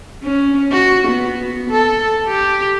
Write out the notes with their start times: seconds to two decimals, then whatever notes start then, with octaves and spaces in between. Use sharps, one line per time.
0.23 C#4
0.72 F#4
1.07 B3
1.70 A4
2.28 G4